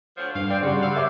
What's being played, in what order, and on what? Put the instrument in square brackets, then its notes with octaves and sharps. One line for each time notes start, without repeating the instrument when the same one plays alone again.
[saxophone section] D2 F3 F#3
[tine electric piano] G2 [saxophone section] F5
[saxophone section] C4 [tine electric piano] D5 G5
[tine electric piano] C#3 G3 [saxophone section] F#4 [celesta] C6
[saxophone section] F5 [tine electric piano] F#5 E6
[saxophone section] F#2 [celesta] A#4 E5 D6